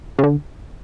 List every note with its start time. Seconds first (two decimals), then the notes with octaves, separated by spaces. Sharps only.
0.19 C#3
0.24 D3